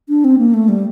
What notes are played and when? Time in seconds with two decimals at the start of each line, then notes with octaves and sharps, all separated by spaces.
0.09 D4
0.24 C4
0.38 A#3
0.54 A3
0.69 G3